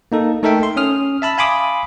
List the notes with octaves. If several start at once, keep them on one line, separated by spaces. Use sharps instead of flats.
A#3 D#4 A4
A3 D#4 A4 A#4 E5 G5
C6
C#4 D#6 F6
E5 A5 B5 E6
F5 G#5 B5 C6 D6 D#6